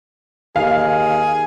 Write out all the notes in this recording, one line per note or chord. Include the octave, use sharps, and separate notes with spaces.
D#2 G#4 F5